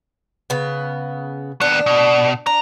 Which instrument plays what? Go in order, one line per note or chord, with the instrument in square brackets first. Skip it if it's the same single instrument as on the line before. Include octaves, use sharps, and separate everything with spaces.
[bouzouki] C#3 B3
[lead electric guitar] D#2 B3 [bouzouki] D4
[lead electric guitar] B2
[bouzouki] D4 [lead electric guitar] A#5